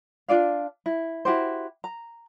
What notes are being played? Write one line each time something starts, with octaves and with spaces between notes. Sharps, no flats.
D4 F4 D5 F5
E4
E4 F#4 G4 C5
A#5